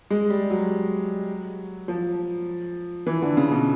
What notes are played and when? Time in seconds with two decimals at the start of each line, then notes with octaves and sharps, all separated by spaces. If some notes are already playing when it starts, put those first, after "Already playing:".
0.10 G#3
0.30 G3
0.50 F#3
1.88 F3
3.07 E3
3.22 D3
3.37 C#3
3.51 B2